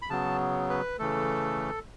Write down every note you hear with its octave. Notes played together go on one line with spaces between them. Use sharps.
B5
C#3 F#3 B3 A5
B4
C#3 E3 A3 A4